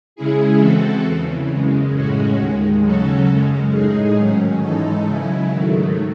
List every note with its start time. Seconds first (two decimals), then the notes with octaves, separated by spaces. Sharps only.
0.16 C#3 G#3 C#4 E4 G#4
0.60 E3 C4 F#4 A4
1.04 E2 C#3 E3
1.49 F#2 C#3 G#3
1.94 A2 G#3 C#4 F#4
2.38 D#2 D#3 G#3
2.83 C#3 F#3 C#4 F#4 A4
3.27 F#2 C#3 G#3 C#4
3.72 A2 G#3 D#4 G#4
4.17 G#2 D#3 F#3 C#4
4.62 G#2 E3 G#3 D#4 A4
5.06 C#3 F#3 C#4 E4
5.51 G#2 D#3 F#3 A3